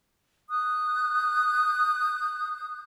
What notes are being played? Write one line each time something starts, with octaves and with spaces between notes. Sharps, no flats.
D#6 F#6 G6